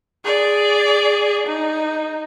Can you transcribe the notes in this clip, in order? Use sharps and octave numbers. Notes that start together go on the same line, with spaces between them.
G#4 D5
D#4